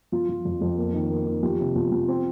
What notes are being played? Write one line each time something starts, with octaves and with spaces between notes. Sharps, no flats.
F3 F4
F3
F2
F2
A#3
D#3
A#3
D#3
F3 G4
C3
F3
F3
C4